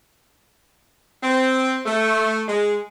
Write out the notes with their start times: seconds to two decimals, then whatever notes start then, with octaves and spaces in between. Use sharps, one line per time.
1.23 C4
1.86 A3
2.48 G#3